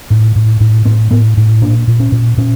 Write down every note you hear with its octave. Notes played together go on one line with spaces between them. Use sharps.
A2
A2
A2
A2 C4
A2 B3
A2
A#2 D4
A#2
C#4
A#2
A#2 C#4